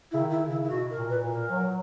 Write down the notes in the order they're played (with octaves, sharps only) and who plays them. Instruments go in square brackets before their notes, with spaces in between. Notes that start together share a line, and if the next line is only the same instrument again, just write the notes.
[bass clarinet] C#3 [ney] E4
[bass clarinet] D#3
[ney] E4
[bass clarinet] C#3
[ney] E4
E4
[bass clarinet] B2 [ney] F#4
[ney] A#4
[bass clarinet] A#2
[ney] B4
[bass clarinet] A#2
[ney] A#4
[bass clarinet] F#3